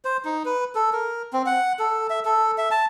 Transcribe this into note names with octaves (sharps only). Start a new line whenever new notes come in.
C5
D#4
B4
A4
A#4
C4
F#5
A4
E5
A4
E5
A5